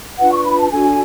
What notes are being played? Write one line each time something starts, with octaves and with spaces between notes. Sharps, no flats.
D4 F4 B4 F#5
C#6
B5
A5
D4 F#4 A4 G#5